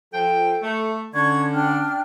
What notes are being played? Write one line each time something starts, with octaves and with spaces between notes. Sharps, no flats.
F3 A4 G5
A3
D3 C#4 A5 C#6 G#6
D4 G5 F6